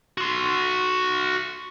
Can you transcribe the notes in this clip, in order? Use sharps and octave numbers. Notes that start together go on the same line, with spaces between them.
F#4 C6